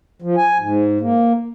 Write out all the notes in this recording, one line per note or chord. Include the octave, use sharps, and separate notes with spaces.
F3
G#5
G#2
A#3